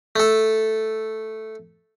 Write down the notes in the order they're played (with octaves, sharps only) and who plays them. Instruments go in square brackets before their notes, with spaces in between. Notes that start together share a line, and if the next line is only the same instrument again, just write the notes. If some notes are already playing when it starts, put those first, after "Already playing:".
[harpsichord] A3 A4